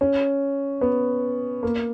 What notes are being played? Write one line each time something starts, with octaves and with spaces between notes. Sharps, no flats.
C#4
B3
A#3